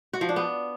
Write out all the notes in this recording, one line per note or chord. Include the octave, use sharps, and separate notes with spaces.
F#4
F3
D4
B3